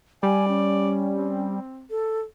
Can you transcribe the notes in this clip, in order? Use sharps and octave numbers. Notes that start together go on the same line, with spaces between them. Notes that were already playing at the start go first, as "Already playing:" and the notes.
G3 D5 G#5
C#4
C4
A4